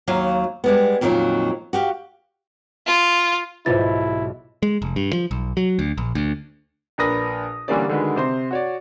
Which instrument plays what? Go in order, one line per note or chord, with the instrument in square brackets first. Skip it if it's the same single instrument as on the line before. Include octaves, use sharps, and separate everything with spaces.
[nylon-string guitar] D#2 F#3 F5
G3 G#3 B3
F2 A#2 D#3 E3 F#3
F#4 G4 F5
[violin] F4
[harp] B1 G#2 [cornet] E4 [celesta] F4 A6 [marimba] B4 C5
[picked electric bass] G#3
F1
G2
F3
B1
F#3
D2
A#1
D2
[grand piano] A#1 D4 A#4 B4 D#6 A#6
D3 E3 G3 A#3 C#4 D5
D3 D#3 G#3 F#4 B4
C3 C5 C6
F#4 C#5 D5